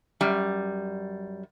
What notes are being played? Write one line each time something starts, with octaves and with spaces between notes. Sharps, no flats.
F#2 G3